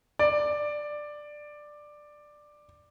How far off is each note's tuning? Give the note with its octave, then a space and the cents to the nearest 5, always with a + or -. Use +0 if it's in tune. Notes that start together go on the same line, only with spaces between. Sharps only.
D5 +10